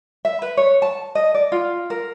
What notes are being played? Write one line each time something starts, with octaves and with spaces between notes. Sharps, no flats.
E5
B4
C#5
A5
D#5
D5
F4
A#4